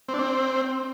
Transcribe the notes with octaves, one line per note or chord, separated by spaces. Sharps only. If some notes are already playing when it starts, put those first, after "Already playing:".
C4
D4
C4